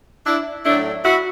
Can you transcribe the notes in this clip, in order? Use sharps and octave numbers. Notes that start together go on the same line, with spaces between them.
D4 E4
A2 F#3 A3 D4 E4
E4 F#4